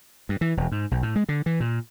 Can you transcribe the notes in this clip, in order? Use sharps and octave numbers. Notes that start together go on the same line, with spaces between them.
G2
E3
E1
G#2
B1
A2
G#3
D3
E3
A#2